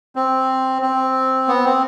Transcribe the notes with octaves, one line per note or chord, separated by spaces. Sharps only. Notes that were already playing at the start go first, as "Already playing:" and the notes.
C4
C4
B3
C4